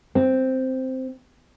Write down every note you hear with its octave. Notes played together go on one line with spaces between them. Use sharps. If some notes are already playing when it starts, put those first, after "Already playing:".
C4